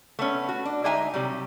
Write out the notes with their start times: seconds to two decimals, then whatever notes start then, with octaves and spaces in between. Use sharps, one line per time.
0.19 A3 B3 C#4
0.49 F#4
0.65 D4
0.84 D3 G#3 D#4 E5 G#5 A#5
1.14 C3 F#3 G3